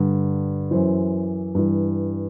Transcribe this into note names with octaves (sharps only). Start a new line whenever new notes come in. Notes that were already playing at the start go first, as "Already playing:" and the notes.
Already playing: G2 D3
F#2 E3 C5
G2 E3